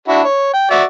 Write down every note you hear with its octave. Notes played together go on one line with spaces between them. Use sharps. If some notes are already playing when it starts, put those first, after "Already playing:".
D4 E4 F#4
C#5
G5
F#4 D5 E5